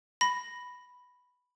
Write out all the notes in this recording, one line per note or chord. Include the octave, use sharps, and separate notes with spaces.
B5 A#6